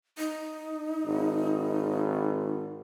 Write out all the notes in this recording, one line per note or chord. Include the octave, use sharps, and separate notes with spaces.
D#4
G#1